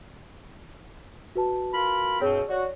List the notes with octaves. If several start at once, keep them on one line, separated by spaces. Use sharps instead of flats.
F#4 B4 A5
F4 A#4 B5
G2 B2 C4 G#4 C#5
F#4 C#5 D5